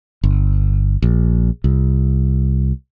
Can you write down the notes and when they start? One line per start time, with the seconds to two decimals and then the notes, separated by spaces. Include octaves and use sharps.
0.24 G1
1.02 A#1
1.64 C2